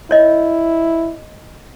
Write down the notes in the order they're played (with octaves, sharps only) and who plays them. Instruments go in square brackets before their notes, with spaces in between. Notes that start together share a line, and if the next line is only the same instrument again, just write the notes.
[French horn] E4 [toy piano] C#5 D#5